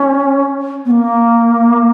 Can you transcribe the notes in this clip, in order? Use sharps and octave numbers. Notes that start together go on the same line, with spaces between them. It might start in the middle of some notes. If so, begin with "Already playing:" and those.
Already playing: C#4
B3
A#3